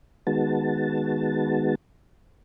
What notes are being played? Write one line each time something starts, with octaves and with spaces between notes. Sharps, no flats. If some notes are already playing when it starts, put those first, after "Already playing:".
D#3 G#3 B3 F#4 A5